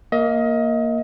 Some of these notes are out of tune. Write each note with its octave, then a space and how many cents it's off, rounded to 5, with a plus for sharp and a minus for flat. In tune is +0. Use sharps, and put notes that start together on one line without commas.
A#3 +0 D#5 +30